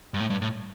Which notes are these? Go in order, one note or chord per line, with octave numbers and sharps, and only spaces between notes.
G2
A2
G2
A2